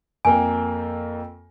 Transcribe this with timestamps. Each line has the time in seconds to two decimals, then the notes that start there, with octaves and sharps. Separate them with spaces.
0.25 F2 A#3 G5 G#5